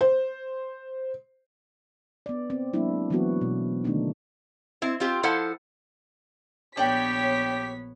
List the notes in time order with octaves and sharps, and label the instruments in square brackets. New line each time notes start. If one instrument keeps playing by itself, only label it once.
[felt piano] C5
[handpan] B3 D5
C4
F#3 G#3 A#3 D4 E4
E3 F#3 A3 B3 E4 F#4
B2
D3 D#3 A3 A#3 D4 D#4
[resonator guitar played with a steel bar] C4 E4
C4 F4 G4 C5
F3 E4 A4 C5 F5 F#5
[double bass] A#1 B3 [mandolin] D4 G5 [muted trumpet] G4 [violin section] C#5 B6